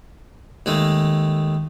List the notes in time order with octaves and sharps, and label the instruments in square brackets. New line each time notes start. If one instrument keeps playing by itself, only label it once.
[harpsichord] D#2 G#3 A3